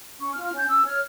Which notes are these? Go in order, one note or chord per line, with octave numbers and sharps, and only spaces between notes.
C#4 C#6
F6
F4
F6
C#4 G6
C#4 E6
C#5 F6